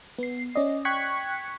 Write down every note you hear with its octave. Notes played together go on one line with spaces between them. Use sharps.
B3 C7
C#4 D5 D#5
G5 C#6 F#6 G#6 B6 C#7